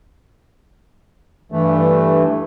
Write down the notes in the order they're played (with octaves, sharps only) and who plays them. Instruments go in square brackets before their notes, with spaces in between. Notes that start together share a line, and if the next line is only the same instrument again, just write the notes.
[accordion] G2 E3 A3